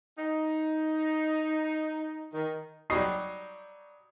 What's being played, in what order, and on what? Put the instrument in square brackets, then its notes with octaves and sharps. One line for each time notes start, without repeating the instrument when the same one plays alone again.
[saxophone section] D#4
D#3
[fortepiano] F#3 G3 D#4 [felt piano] C#6 D#6 C7